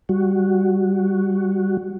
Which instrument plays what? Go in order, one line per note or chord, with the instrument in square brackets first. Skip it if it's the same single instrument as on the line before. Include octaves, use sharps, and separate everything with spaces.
[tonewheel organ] G3 F#4